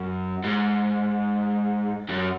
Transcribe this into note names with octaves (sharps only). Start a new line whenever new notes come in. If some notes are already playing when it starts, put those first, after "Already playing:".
Already playing: F#2
G#2
F#2